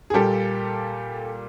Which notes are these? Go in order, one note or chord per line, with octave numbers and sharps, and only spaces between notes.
G#4
A#2 G3 A#3 G4 A4